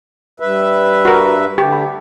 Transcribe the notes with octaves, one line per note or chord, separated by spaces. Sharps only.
G2 B4 E5
F#4 A#4
D3 A3 G4
B5